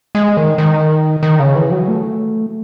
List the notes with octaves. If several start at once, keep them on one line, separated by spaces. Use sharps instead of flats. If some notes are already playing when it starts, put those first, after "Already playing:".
G#3
D#3
D#3
D#3
C#3
E3
F#3
A3